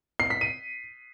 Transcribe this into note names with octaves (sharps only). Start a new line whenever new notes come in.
C7
B6
D#7